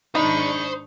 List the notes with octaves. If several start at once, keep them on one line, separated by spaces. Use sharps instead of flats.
G#1 D4 D#4 C5 B5 C#6